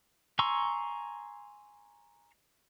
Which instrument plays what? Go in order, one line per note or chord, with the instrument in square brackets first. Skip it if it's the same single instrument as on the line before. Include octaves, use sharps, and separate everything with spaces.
[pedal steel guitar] G#5 A#5 C6 C#6 E6